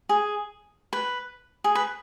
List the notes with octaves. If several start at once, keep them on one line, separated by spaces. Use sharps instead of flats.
G#4
B4
G#4
B4